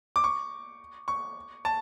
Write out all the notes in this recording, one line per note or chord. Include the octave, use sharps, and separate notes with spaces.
D6
C#6
C#6
A5